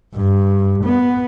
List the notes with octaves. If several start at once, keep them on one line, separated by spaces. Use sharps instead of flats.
G2
B3